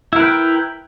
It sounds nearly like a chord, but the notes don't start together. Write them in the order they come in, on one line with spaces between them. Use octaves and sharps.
E4 A#4 B4 G5